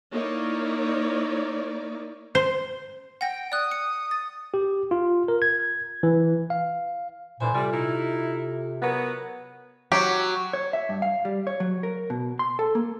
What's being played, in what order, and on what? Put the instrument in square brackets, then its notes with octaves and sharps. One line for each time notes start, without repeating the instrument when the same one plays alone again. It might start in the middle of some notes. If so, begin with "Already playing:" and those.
[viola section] A#3 D#4 E4 C#5 D5
[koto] C5
[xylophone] F#5 A#6 [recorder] G5
[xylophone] D5 F#6 [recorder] D#6
[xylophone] C#7
A6
[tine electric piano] G4
F4
A#4
G#6
E3
F5
[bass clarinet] A#2 [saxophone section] D3 E3 C5 [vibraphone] G#5 B5 C6
[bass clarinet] C3 [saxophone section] G3 [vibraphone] F4 A4
[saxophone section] D#4 E4
[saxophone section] F#3 B3 [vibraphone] A#4
[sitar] F#3 [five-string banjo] G4
[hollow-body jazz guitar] C#5
E5
G2
F5
G3
C#5
F#3
A#4
B2
C6
A4
A#3